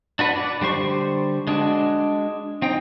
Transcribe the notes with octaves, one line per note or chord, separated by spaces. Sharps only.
D4 F#4 B4
D5
D3 G3 C5 C#6
G#3 D4 F#4
C4 D#4 G5